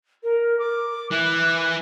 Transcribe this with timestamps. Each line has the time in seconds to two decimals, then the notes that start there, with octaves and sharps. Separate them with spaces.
0.23 A#4
0.59 D6
1.12 E3 F#6